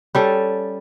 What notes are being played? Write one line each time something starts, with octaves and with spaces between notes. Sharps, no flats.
G3 C#4 A4